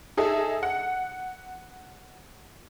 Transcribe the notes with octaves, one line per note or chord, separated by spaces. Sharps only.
D#4 G#4 A4 E5
F#5